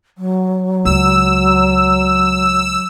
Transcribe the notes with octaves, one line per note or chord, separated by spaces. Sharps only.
F#3
C#2 E6